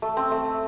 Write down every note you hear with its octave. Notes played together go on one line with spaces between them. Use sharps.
A3
C4
A3